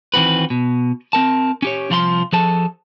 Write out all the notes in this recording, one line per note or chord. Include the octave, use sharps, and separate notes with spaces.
D#3 E3 C4 F#4 B4
B2
C4 A#4 A5
C#4 G4 C#5
C2 F3 F4 C5 B5 C6
F3 G#4 A4 A5